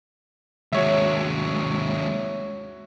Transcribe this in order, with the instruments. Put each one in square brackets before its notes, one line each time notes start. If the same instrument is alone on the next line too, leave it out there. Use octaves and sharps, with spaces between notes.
[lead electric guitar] D#2 G#3 [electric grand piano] F#4 C#5 E5